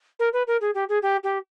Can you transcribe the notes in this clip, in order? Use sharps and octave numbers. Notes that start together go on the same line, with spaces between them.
A#4
B4
A#4
G#4
G4
G#4
G4
G4